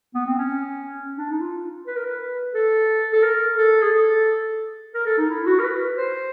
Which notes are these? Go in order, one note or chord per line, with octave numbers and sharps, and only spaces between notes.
B3
C4
C#4
D4
D#4
F4
B4
A#4
B4
A4
A4
A#4
A4
G#4
A4
A#4
A4
D#4
E4
F#4
A#4
B4
C5